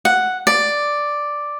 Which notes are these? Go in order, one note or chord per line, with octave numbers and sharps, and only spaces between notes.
F#5
D5